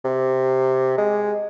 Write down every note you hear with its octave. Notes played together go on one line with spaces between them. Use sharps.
C3
G#3